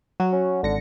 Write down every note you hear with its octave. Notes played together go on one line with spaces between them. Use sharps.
F#3 F#4
C#4
G#1 D3 A#6 C#7